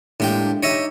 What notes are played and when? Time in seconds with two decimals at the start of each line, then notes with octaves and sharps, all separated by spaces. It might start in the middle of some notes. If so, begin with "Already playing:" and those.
0.20 A2 G#3 A#3 D4 G4 G5
0.63 D#4 G4 C#5 D#5 E5